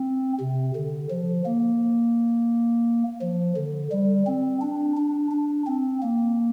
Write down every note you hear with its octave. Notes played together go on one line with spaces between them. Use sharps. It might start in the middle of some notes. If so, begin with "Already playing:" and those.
Already playing: C4
C3
D3
F3
A#3
F3
D3
G3
C4
D4
D4
D4
C4
A#3